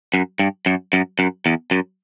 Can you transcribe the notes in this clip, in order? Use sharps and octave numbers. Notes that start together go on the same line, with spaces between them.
F#2
G2
F#2
F#2
F#2
E2
F#2